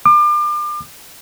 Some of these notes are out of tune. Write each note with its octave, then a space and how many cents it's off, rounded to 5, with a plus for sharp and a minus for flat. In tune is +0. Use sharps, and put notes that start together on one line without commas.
D6 +35